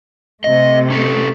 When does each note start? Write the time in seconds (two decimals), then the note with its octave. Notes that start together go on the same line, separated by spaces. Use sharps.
0.44 C3 A3 D#5
0.90 C#4 G4 A4